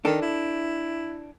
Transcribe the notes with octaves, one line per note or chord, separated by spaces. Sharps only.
D#3 D4 A4
E4